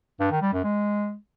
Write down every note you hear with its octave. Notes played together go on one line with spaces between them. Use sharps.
G2
D#3
G3
F#2
G#3